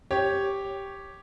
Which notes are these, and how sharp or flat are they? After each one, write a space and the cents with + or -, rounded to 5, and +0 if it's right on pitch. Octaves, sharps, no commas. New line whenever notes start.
G4 +0 C#5 +0